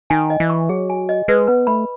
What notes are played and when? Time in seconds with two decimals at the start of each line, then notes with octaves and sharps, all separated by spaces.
0.10 D#3 G#5
0.30 D#5
0.40 E3
0.50 C#6
0.69 F#3 G#4
0.90 G#5
1.09 D#5
1.28 G#3 B4
1.47 B3 B4
1.67 A3 B5